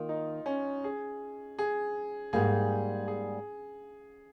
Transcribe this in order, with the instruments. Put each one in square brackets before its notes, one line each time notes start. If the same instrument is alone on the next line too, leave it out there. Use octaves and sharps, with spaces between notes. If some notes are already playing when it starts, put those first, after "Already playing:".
Already playing: [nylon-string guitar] D#3 A#3 [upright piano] F4
[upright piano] D#4
C#4
G#4
G#4
[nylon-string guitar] G#2 G3 A#3 [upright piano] G#4
[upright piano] G#4